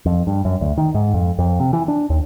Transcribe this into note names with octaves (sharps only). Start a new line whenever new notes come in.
F2
G2
F#2
D2
D#3
G#2
F2
F2
C3
E3
D4
D#2